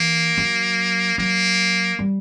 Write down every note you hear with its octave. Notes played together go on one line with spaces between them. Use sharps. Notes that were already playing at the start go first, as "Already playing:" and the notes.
Already playing: E3 A#3
F#3
F#3 A#3
G3